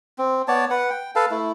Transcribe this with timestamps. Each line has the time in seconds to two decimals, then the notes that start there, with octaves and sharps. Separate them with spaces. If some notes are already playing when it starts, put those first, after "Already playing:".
0.18 C4
0.48 B3 C#5 D5 A5
0.70 B4 F#5
0.90 G5
1.16 A4 B4 F5 A5
1.31 A3 E4